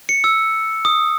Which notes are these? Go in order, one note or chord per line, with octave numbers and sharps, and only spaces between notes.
C#7
E6
D#6